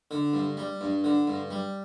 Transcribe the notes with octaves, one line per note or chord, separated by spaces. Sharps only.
D3
G2
G3
G2
D3
G2
G3